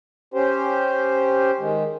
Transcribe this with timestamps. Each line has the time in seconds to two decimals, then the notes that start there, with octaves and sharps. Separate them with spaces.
0.34 C#4 G4 C5
1.59 D#3 G#3